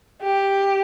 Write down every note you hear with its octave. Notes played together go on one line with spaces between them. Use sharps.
G4